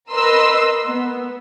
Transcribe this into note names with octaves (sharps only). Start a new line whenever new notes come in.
A#4 B4 D#5 C6 E6
B3